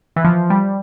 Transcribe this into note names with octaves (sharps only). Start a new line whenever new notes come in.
E3
F3
G3